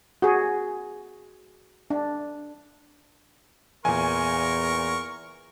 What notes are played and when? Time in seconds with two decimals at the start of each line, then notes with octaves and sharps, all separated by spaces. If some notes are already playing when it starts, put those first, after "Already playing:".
0.22 F#4 G#4
1.90 D4
3.85 E2 A#2 A#4 G#5 C#6